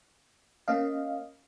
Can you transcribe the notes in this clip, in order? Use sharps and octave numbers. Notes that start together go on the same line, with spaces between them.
A#3 C#4 D#5 F5